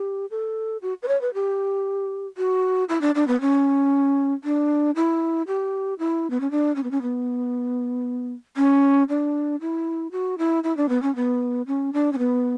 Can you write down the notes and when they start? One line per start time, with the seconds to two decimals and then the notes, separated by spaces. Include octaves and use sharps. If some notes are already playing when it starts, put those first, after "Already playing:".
Already playing: G4
0.31 A4
0.82 F#4
1.02 B4
1.08 C#5
1.21 B4
1.34 G4
2.38 F#4
2.89 E4
3.01 D4
3.15 D4
3.27 B3
3.41 C#4
4.44 D4
4.96 E4
5.47 G4
5.99 E4
6.30 B3
6.40 C#4
6.51 D4
6.76 C#4
6.83 B3
6.91 C#4
7.02 B3
8.57 C#4
9.09 D4
9.61 E4
10.12 F#4
10.38 E4
10.64 E4
10.77 D4
10.89 B3
11.02 C#4
11.16 B3
11.67 C#4
11.93 D4
12.12 C#4
12.18 B3